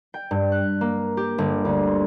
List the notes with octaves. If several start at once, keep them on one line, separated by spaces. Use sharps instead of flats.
G5
G2
F#6
A#3
G4
G1
D2
C6